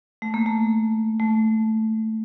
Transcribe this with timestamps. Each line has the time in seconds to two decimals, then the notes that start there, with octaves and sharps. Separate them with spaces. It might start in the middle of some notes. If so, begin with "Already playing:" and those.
0.22 A3
0.34 A#3
0.46 A3
1.20 A3